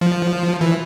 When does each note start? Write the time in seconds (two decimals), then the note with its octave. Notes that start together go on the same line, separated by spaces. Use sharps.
0.01 F3
0.61 E3